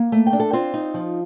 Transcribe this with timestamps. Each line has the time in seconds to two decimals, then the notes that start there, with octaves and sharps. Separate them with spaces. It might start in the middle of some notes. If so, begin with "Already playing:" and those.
Already playing: A#3
0.12 A3
0.27 G5
0.33 D4
0.40 A4
0.53 C4 F4
0.74 D#4
0.94 F3